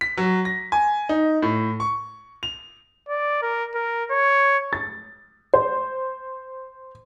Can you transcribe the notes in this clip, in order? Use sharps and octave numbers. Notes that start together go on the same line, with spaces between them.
B6
F#3
A#6
G#5
D#4
A2
C#6
F7
D5
A#4
A#4
C#5
A6
C5